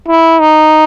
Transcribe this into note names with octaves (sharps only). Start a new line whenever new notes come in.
E4
D#4